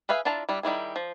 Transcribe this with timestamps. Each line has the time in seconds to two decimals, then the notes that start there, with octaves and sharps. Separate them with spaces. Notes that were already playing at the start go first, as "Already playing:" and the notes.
0.09 G#4 B4 E5 F5 G#5
0.25 D4 E4 F4 A5 A#5
0.49 G3 D4 E4
0.63 D#3 G3 E4 G#4
0.96 F3